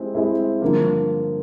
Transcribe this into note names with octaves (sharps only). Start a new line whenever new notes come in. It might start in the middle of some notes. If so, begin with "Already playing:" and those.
Already playing: G#3 C4 E4 G4
G#3 C4 E4 G4
G2 D3 F3 A#3